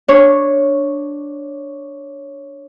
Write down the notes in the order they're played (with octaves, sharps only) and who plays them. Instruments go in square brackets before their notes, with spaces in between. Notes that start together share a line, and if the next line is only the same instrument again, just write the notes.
[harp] D4 C#5